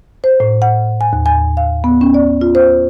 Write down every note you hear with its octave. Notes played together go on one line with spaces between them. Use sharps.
C5
A2
F#5
G#5
D#2
G#5
F5
B3
C#4
D5
F4
C5